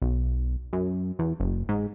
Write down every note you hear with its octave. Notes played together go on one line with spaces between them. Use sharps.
B1
F#2
E2
F#1
G#2